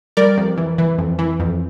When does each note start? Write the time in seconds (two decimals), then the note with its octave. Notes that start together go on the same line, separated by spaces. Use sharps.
0.17 G3 A#4 D5
0.37 F2
0.57 E3
0.78 E3
0.98 F2
1.19 E3
1.39 F2